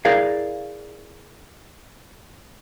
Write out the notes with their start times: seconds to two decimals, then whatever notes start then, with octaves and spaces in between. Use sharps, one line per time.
0.05 E4 G#4 A#4 D5 F5